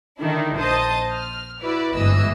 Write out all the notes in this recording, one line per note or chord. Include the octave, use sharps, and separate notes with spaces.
D3 D#3 D4 E4
A#1 C5 D#5 A5 D#6
F6
E4 F#4 B4 D5
G1 G#2 E3 D#5 E6